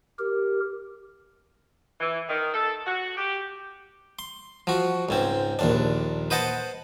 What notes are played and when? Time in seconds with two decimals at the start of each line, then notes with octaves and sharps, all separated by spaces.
0.19 G4 A#4
2.00 E3
2.29 D#3
2.54 A4
2.86 F#4
3.17 G4
4.19 C6
4.67 F3 F#4
5.09 C#2 G#2 C4
5.59 A#1 D#2 D4
6.30 B4 C5 D#5 F#5 A5